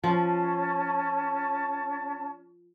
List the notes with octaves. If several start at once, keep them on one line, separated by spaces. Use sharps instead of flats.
F3 C#4 A5